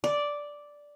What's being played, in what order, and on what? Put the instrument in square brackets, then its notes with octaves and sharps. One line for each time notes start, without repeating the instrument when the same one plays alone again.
[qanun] D5